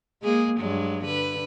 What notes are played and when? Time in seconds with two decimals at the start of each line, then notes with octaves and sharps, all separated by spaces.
0.23 G#3 A#3 G#4
0.60 G2 F#3 G#3
1.05 D3 B4